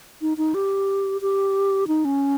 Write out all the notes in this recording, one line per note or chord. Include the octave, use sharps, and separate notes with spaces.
D#4
D#4
G4
G4
D#4
C#4